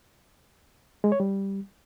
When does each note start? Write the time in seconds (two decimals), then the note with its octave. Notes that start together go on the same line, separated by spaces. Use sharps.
1.04 G#3
1.12 C#5
1.20 G3